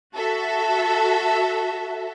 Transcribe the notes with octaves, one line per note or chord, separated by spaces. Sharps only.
F#4 A4 E5